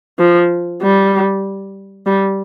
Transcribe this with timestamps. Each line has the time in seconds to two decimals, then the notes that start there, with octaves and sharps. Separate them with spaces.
0.19 F3
0.82 G3
2.06 G3